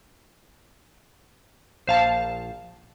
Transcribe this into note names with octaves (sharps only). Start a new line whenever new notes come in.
A#1 C5 F5 A5